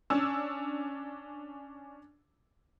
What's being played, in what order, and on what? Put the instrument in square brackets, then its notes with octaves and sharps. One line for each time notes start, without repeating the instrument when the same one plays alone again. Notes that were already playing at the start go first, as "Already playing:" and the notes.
[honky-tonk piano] C#4 D4 E6